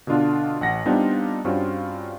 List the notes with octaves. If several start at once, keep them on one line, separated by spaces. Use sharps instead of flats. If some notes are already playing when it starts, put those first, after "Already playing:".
B2 D3 D4 F4
A1 F#5 A#6
G3 B3 C4 D4 D#4 F4
G2 C4 C#4 F4 F#4